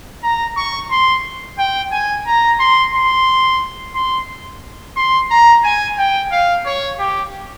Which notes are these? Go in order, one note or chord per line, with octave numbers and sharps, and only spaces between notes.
A#5
C#6
C6
G5
G#5
A#5
C6
C6
C6
C6
A#5
G#5
G5
F5
C#5
G4